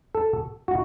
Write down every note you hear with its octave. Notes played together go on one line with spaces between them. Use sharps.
A4
F#4